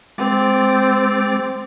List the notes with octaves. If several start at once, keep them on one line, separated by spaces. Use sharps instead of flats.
G#3 C4 D6 A6